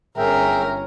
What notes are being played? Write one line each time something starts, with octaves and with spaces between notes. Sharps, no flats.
G1 C#4 G#4 A#4 E5 G5